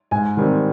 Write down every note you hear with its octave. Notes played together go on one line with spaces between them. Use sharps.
G#2 G#5
D#3 G3 C4